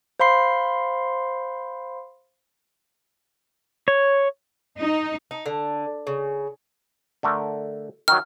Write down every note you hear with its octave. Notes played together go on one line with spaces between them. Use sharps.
C5 F5 B5 C6 C7
C#5
D#4
D#4
D3
C#3
D3 A3 A#4
D#3 F#3 F6